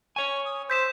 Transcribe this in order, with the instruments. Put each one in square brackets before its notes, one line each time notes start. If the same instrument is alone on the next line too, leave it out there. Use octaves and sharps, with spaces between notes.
[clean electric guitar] C#5 G#5 [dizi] C#6
[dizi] D#6
[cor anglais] C5 [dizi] E6 [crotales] G6 B6 E7